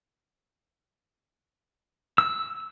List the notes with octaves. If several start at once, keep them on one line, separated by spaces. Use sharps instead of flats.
E6